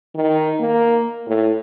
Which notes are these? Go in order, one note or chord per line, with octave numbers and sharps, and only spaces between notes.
D#3
A#3
A2